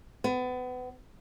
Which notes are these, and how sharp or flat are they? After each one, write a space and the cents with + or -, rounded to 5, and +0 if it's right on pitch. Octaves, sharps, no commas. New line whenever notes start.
B3 +30